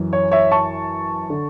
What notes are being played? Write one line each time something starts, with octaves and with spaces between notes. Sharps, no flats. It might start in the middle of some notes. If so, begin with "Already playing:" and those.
Already playing: F#2 E3
C#5
C#5 E5
A5 C#6
D3